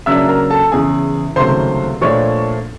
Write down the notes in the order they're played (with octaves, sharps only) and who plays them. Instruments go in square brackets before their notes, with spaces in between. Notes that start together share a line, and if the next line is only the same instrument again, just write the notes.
[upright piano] C#3 F#3 A#3 D4 E5 E6
A#4 A#5
A4 A5
E2 C#3 E3 G#4 G#5
C#2 C3 D#3 F#3 A3 C5 C6
A#2 F3 A3 D4 C#5 C#6